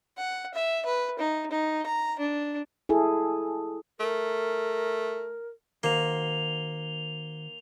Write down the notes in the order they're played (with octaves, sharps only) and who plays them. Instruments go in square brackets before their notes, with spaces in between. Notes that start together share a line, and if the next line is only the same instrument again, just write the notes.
[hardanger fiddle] F#5
E5
B4
D#4
D#4
A#5
D4
[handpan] E4 G#4 A4
[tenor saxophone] A3 [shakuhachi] A#4
[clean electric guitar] D#3 F#4 C5 [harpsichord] A#3 [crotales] F7 G7